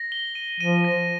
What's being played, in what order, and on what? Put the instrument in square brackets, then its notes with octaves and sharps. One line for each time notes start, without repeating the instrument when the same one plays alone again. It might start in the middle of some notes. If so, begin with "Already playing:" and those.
Already playing: [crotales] A#6
G7
D#7
[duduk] F3 [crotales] D#7
[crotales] A#6